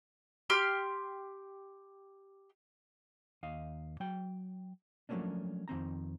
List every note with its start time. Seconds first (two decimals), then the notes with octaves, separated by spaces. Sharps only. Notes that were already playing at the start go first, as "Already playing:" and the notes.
0.50 G4 C6 F6
3.43 D#2 D#5 F5
4.00 F#3 G5
5.09 F3 F#3 A3 A#3 C#4 D4
5.68 F2 D#3 C4 A#5